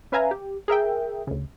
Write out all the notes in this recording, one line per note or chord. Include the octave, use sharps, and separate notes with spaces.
C#4 B4 E5 F5 G#5 A#5
G4
G#4 A#4 E5 G5
D2 C#3